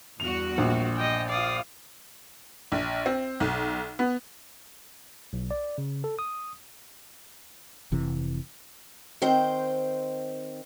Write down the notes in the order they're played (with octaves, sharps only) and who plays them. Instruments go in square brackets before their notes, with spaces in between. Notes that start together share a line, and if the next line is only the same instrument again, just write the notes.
[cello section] E2 G2 F#4 [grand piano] F7
[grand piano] A#1
[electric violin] D#5 G5
[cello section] F4 F5 [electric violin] D5 D#6
[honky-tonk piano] A#1
C4
B1
B3
[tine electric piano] B1
D5
C#3
A4
D#6
[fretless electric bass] F1 C3 E3
[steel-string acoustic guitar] D#3 C4 C5 G5